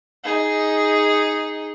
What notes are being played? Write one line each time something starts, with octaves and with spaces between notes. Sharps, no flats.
D#4 G#4